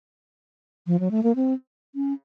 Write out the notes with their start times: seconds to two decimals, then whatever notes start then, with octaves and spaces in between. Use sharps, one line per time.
0.87 F3
1.00 F#3
1.11 A3
1.23 A#3
1.36 C4
1.95 C#4